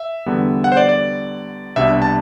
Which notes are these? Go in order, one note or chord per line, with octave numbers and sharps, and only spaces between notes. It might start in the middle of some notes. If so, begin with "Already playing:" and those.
Already playing: E5
E2 D3 G3 B3
F#5
C5
D5
D5
C2 B2 G3 D4 E5
A5